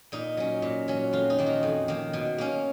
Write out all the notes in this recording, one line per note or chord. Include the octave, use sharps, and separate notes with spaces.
A#2 D#4
F#3 C#4
A#2
F#3 C#4
F2 F4
D#4
D#3 A#3
F#4
F2
D#3 A#3
B2
A#3 C#4